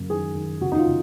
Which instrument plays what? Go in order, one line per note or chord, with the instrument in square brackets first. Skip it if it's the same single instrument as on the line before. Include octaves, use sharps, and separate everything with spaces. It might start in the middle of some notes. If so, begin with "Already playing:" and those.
Already playing: [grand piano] F#2 C#3 A#3
D#3 G#4
D#3
C#3 F#4
D#4
F4
C#3